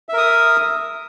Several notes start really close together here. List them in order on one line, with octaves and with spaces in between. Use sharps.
E5 A#4 D#6